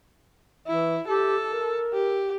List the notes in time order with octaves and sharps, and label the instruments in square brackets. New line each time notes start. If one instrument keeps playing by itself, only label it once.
[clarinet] E3 [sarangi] E4
[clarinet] G4 [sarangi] A4
[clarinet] A#4
[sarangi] G4